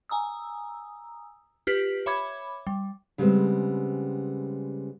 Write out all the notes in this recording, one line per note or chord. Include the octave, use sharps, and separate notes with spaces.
G#5 A#5 D#6 E6
F4 G4 B4 B6
C#5 E5 B5 D6 G#6
G3
C#3 G3 G#3 B3 C4